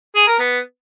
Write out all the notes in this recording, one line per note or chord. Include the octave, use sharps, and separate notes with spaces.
G#4
A#4
B3